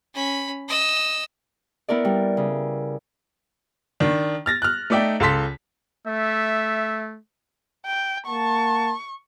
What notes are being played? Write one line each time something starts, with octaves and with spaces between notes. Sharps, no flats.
C#4 B5
D#5 E6
B3 E4 A#4 D5
G3
C#3
D#3 D4
F6 A6 A#6
F6 F#6
A3 D#4 D5 E5 G5
C#2 A4 A5 C6 B6
A3 E5
G5
A#3 F#5 A5 C#6